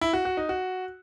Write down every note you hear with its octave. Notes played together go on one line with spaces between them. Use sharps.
E4
F#4
F#4
D#4
F#4